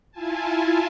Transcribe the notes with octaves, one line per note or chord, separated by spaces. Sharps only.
E4 F4 G#5 A5